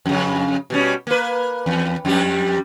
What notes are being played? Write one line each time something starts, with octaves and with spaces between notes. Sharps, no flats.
F2 C#3
B2 G3 C#4
A#3 B4
E2
F2 G3 G4